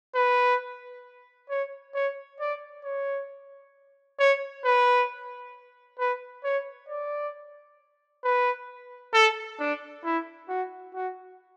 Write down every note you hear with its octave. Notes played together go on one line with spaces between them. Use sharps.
B4
C#5
C#5
D5
C#5
C#5
B4
B4
C#5
D5
B4
A4
D4
E4
F#4
F#4